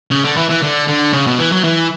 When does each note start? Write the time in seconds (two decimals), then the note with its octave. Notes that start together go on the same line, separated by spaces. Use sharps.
0.11 C#3
0.24 D3
0.36 E3
0.49 E3
0.62 D3
0.88 D3
1.13 C#3
1.26 B2
1.39 E3
1.52 F#3
1.64 E3